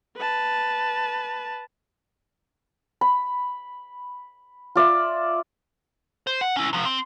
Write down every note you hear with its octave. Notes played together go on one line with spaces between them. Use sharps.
B4 A5
B5
F4 D5 E5
C5
F#5
C#4 E4
C3 F3
C4